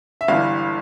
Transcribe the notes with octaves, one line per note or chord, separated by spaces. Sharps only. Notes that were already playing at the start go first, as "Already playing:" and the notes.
E5
G1 G2 E3 F5